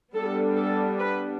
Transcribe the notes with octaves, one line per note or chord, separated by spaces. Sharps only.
G3 B3 D4 A4
A4
B4